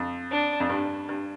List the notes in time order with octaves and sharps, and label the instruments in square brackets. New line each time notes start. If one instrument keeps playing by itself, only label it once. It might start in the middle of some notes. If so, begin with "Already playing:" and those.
Already playing: [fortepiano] F2
[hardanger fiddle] D4
[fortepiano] F2
G2
G2